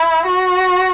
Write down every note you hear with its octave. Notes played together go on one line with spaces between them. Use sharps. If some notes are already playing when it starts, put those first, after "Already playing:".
Already playing: E4
F#4